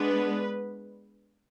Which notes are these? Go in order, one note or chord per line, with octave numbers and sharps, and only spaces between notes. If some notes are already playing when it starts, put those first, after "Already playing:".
Already playing: G#3 B3 D4 B4